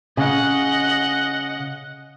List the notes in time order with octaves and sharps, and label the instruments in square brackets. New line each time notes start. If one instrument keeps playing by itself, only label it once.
[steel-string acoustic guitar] C#3 [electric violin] D#5 F#5